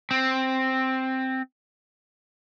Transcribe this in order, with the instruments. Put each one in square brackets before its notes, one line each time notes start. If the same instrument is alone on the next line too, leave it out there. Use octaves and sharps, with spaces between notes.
[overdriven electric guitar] C4